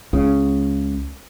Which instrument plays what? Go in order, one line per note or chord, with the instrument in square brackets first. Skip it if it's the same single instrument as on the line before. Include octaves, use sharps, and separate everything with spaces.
[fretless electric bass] C#2 C#3